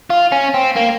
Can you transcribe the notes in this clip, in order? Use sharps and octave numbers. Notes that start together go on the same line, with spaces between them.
F4
C#4
C4
A#3